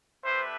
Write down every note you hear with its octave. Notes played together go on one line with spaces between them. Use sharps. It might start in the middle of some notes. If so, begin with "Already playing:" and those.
A3 D4 G4 B4 C5 E5